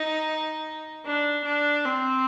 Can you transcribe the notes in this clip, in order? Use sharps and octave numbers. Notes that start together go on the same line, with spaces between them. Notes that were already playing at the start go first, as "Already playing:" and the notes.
Already playing: D#4
D4
D4
C4